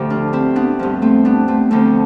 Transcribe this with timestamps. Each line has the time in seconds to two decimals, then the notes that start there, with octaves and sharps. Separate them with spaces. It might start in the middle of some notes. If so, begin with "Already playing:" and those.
Already playing: D2 A2 D3 F3 G4
0.10 D4 F4
0.33 C4 E4
0.56 B3 D4
0.79 G2 F3
1.02 A3 C4
1.25 B3 D4
1.48 A3 C4
1.71 D2 D3 F3 A3 C4